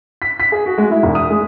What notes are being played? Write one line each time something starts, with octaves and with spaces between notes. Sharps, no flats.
B6
B6
G#4
F#4
G#3
E4
E1
D#6
G#3